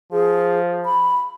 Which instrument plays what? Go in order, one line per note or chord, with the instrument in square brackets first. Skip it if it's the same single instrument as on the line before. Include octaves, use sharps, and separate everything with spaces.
[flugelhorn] F3 [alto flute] G#4
[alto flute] B5